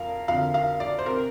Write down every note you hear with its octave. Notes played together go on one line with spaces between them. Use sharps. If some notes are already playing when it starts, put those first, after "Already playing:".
Already playing: F2 A#4 F5
F2 D3 F5
F5
D5
C5
C3 A#4